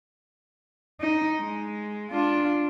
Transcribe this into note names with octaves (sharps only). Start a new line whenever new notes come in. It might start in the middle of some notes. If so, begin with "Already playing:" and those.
D#4
G#3
D4 F4